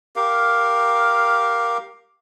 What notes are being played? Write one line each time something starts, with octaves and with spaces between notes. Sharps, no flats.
G4 A#4 F5